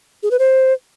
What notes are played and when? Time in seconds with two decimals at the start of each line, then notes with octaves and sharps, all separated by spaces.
0.23 G#4
0.31 B4
0.39 C5